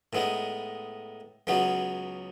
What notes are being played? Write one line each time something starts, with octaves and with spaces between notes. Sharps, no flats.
A2 G#3 B3 D#4
C#2 C#3 F#3 B3 D#4